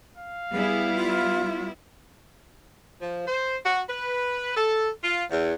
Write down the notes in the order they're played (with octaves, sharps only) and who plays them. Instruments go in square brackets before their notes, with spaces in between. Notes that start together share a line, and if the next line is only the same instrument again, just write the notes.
[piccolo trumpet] F5
[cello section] G3 B3 E4 [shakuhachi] G#4
[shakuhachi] F4
[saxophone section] F3
C5
F#4
B4
A4
F4
E2